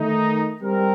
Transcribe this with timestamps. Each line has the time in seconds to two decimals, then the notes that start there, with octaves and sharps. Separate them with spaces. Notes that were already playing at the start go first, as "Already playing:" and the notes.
Already playing: D#3 A3 D#4
0.61 G3 C4 G4 A#4